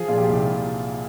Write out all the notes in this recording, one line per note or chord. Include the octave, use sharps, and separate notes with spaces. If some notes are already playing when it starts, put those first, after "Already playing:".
Already playing: F3 G#4
A#2 F4
G4
C2